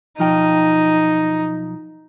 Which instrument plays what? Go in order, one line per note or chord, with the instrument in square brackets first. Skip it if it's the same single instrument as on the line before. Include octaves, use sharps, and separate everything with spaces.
[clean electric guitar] B1 F3 G5 [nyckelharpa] D#4